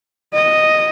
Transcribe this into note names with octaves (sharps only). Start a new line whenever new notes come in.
D#5